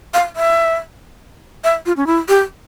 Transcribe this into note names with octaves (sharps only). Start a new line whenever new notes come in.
F5
E5
E5
F4
C#4
E4
G4